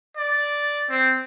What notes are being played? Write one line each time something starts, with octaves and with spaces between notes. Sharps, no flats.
D5
C4